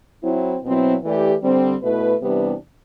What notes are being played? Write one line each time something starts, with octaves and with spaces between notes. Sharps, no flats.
F#3 C4 E4
B2 F#3 C4 E4
E3 A3 E4 G4 D5
D3 G3 C4
B2 A3 E4 B4
C3 E3 G3 B3 D4